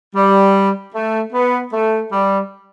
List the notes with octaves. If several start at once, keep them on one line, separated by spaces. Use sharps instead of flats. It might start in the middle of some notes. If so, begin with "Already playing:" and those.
G3
A3
B3
A3
G3